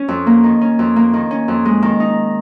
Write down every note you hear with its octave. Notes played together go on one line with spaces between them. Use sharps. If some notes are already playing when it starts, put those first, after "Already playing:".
Already playing: C#4
F2
A#3
D#3
C#4
F2
A#3
D#3
C#4
F2
G#3
D#3
D#4